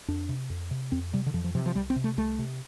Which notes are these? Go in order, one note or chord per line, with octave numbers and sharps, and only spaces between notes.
F2 D4
C3
F2
C3
F2 C4
C3 G3
D3
F2 F3
F3
C3 F3
F3
C2 G3
C4
C3
A3
C2 A3
C3